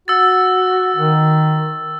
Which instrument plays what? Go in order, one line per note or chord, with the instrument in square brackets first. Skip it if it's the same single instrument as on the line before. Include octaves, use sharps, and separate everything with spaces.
[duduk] F#4 [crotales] E6 A6
[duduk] D#3